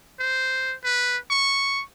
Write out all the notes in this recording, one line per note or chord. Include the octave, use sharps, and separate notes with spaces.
C5
B4
C#6